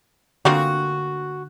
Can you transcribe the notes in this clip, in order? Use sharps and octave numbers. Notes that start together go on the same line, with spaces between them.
D3 A#3 C4 F4 F#4